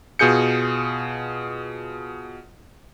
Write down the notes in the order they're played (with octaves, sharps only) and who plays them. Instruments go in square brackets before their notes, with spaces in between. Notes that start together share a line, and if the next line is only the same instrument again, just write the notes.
[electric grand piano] B2 F4 G#4 G6 C#7